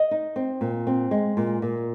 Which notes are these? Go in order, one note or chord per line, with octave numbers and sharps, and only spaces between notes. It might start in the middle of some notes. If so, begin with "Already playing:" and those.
Already playing: D#5
D#4
C4
A#2
C4
G#3
A#2
A#2